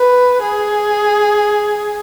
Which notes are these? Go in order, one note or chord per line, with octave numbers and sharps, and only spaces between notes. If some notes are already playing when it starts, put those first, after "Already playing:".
Already playing: B4
G#4